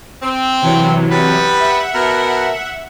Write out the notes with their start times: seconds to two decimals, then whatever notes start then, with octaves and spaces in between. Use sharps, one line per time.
0.22 C4
0.62 C3 E3 F#3
1.10 G3 B3 B4
1.60 E5 F#5
1.93 B2 A#4